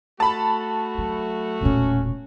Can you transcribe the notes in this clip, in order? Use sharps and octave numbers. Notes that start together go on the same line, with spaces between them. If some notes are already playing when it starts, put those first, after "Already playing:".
A3 F#4 A5 B5
F#3
E1 A#2 C#4